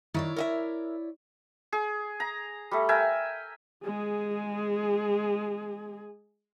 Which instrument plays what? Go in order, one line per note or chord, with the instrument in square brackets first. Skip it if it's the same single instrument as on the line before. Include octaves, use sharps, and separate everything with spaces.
[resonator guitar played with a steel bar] D#3 [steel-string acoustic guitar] E4 C#5 D5
[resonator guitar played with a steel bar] A#4 D#5 E5
[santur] G#4
A#5
G3 A3
A#4 E5 G5 G#5
[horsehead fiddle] G#3 G#4